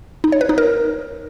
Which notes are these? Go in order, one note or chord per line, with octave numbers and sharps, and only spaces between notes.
D#4
C#5
B4
D#4
A#4